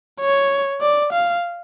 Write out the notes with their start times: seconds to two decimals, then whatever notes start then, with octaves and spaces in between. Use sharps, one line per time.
0.21 C#5
0.81 D5
1.13 F5